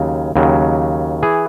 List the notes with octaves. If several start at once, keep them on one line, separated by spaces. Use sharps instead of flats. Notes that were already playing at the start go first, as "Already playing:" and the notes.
Already playing: D#2 C#3 F#3
D#2 C#3 F#3
E3 G#4